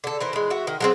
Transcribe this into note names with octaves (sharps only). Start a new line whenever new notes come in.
D3 A4
E3 A#4 C5
E3 G#3
F#4 E5
D#3
F#3 G#3 C4